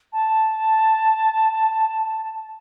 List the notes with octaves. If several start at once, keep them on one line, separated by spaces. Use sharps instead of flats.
A5